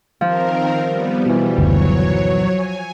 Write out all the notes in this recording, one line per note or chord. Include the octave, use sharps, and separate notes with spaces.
D#3 F3 C4 A#4
G3 B3
B2 E3 G3
F#1 D2 F#3 C#5
G#5